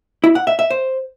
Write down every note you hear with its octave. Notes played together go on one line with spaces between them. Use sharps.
E4
F#5
E5
E5
C5